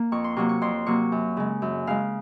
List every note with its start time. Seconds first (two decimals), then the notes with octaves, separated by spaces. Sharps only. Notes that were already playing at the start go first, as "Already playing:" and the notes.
Already playing: A#3
0.12 F2 C#6
0.24 C6
0.36 C3 F#3 A#3 C#6
0.49 C#6
0.62 F2 C6
0.86 C3 F#3 A#3 C#6
1.12 F#2
1.37 C#3 G#3
1.62 F#2
1.87 C#3 G#3 F5